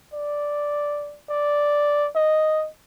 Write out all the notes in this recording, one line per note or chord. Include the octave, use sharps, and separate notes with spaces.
D5
D5
D#5